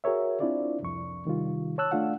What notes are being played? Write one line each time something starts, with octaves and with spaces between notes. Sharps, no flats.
F#4 G#4 A#4 C#5 E5
C4 D4 E4 F4 D5
C2 F2 C#6
C3 D#3 G3 F4
C#5 A5 E6 F#6
A3 D4 F4 F5 F#5